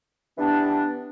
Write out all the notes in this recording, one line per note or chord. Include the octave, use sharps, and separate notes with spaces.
E3 G3 B3 D4